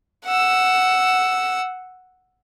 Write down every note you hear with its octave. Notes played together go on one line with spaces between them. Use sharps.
F#5 E6